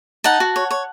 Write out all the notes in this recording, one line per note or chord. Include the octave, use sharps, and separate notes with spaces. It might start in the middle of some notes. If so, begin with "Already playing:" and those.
D#4 F#5 A5
F#4
C#5
C#5